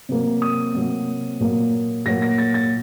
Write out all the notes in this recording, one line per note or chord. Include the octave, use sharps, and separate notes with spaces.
C3 F#3 A#3
D#6
C3 F#3 A#3
A#2 F#3 A#3
A#2 F#3 A#3 A#6
A#6
A6
A6